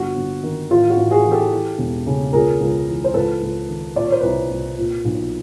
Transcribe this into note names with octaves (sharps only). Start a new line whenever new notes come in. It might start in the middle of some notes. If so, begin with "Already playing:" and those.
Already playing: G1 F#4
G1
D#3
A1 F4
F#4
A1
F#4 G#4
E3
G4 A4
E3
E1
C#3
C#2 G#4 A#4
C#2
E3
C5
C#2 A4 B4
C#2
D#3
A#2 D5
C#5
C5
C2 B4 C#5
C2
A#2
B1